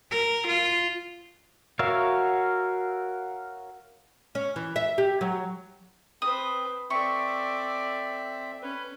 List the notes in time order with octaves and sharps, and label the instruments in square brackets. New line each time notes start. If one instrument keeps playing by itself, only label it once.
[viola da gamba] A#4
F4
[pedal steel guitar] F#4 A#4 C#5 E5 F5
[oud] C#4
E3
E5
G4
F#3
[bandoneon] C4 [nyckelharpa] B4 C5 [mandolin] D#6
[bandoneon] C4 E5 [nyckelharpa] A4 D5 [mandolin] C#6
[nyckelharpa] C#4 [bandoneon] B4